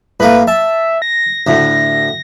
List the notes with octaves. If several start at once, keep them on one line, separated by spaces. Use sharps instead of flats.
A2 A3 A#3 B4
E5 A5
A#6
D2 A2